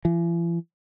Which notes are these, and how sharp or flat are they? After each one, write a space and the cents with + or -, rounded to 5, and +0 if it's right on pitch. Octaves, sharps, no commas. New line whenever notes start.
E3 +45